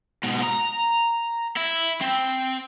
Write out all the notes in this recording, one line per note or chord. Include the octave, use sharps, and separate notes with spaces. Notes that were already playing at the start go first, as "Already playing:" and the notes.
G#2 B2
A#5
E4
C4